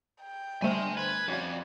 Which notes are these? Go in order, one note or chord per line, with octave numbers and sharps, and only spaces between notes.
G5
G1 G3 A3 C5 G#5 C6 F6
B4 G#6
F2 C#4 F#4 D5